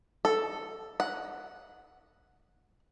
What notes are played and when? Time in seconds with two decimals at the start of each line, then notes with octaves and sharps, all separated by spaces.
0.25 A4
1.00 F#5